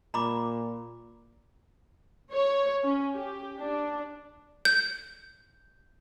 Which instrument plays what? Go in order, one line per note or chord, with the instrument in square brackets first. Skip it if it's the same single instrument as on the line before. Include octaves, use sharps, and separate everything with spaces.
[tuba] A#2 [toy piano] A#5 B5 D6
[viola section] C#5
C#4
G4
D4
[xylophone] G6